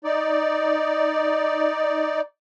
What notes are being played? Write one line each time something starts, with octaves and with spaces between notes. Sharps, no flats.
D#4 D5